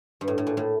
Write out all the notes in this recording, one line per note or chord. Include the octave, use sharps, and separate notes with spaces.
G2
A2
A2
A#2
A2